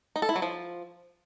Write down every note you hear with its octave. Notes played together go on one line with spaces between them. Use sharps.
D#4
A4
E4
F#3
F3